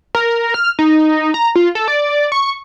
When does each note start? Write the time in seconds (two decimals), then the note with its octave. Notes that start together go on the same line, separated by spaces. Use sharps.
0.15 A#4
0.54 F6
0.79 D#4
1.34 A#5
1.56 F4
1.75 A4
1.88 D5
2.32 C#6